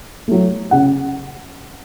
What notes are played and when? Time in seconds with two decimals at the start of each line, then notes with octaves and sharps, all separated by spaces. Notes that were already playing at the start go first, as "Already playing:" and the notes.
0.28 F#3 A3
0.71 C#3 F#5